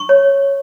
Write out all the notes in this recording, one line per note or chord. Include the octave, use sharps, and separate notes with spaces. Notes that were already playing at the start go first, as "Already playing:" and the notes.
Already playing: C#6
C#5